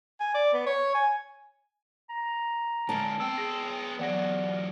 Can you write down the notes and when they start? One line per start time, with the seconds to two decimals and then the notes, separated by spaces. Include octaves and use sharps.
0.20 G#5
0.34 D5
0.53 B3
0.66 C#5
0.94 G#5
2.10 A#5
2.89 D3 G#3 A5 D7
3.20 B3 C4 G5 E6
3.38 G#4 A#6
3.99 E3 F#3 B3 D5 F#5 A#6